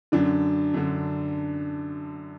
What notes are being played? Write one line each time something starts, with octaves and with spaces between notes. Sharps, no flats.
F#2 D3 D4
F#2 D3